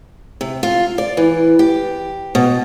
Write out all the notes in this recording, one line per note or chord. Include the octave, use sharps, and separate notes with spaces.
C3
F4
D5
E3
G4
B2